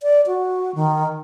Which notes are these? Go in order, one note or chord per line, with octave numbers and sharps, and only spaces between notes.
D5
F#4
D#3